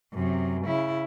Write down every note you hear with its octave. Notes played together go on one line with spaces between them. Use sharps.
F#2 C3
C#3 E4